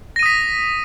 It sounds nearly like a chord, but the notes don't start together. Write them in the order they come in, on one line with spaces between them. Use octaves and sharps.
A#6 D#7 D#6 B6